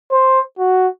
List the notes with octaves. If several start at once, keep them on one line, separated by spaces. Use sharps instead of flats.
C5
F#4